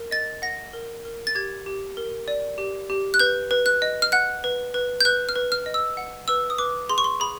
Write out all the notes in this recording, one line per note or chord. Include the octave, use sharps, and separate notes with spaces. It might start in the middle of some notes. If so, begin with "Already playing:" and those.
Already playing: A#4
D#5 A6
F#5 A#6
A#4
A#4
A6
G4 G#6
G4
A#4
D5
G4
G4
F#6
B4 G6
B4
F#6
D#5
F6
F#5 F#6
B4
B4
G6
B4 F#6
F6
B4
F6
D#5
E6
F#5
B4 E6
D#6
B4 D6
G#4 C6
C#6
C6
G#4 B5